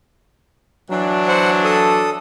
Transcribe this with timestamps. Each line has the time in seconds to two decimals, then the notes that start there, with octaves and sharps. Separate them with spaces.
0.91 E3 F#3 D4
1.28 C5 F#5
1.64 A4 D#6